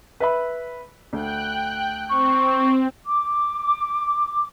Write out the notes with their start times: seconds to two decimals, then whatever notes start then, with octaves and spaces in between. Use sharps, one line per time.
0.20 B4 E5 B5
1.13 D2 G5 F#6
2.10 C4 C#6
3.06 D6